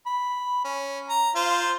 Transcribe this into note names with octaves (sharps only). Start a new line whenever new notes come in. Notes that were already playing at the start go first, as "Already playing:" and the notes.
B5
C#4
A#5
F4 C5